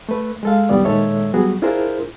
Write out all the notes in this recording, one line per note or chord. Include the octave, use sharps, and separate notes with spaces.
A3 B4
G#3 A4 F5
C2 F#2 D#3 G3 B3 D5
A#2 D#3 G#3 A4 C#5 E5
F#3 G3 B3 F#4 G#4
D4 E4 F4 G#4 A#4 C5